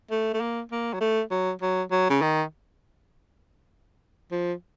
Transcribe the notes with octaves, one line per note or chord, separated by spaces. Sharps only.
A3
A3
A#3
A#3
F#3
A3
F#3
F#3
F#3
C#3
D#3
F3